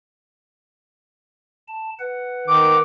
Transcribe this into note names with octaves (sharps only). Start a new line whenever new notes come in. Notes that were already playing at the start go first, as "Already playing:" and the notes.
A5
B4 F#5
D#3 D6